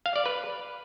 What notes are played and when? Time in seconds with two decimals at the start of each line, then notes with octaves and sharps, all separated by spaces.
0.06 F5
0.16 D5
0.26 B4